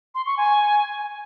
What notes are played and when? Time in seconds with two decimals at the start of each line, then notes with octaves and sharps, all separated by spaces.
0.15 C6
0.26 C#6
0.37 G#5